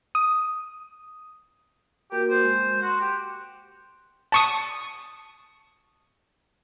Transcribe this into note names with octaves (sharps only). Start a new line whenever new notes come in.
D#6
A#3 F#4 G4 A#4
C5
G#3
F#4 C6
G4
A5 C#6 D#6